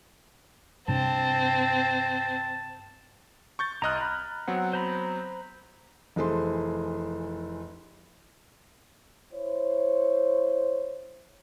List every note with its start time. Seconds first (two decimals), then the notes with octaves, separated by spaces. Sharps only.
0.88 G2 C3 C4 D4 A5
3.59 C#6 G6 A6
3.82 C2 D#5 A#5 F6 F#6
4.01 B5
4.48 F#3 B3 C4 F#5
4.73 C5 A#5 B5
6.16 F1 E3 G#4 A4 C5 C6
9.33 E4 C5 C#5